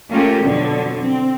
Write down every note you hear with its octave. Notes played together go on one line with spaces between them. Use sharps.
A3 A#3 C#4 F4 G4
F2 B2 D3 F#3
C4